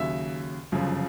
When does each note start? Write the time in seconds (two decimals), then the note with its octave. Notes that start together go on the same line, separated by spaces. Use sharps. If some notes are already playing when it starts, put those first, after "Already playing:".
Already playing: D#2 C#3 F#3 E5
0.72 G1 F#2 C#3 F3